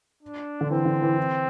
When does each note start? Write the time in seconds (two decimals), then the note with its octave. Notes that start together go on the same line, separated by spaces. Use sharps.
0.23 D4
0.61 D3
0.70 E3 C4
0.85 D3
1.02 E3
1.17 E3